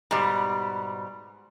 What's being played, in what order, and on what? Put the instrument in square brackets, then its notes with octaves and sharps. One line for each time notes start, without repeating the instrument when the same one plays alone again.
[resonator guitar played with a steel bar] G#2 B2 G3